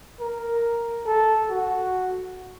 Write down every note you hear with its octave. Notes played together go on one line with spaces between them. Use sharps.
A#4
A4
F#4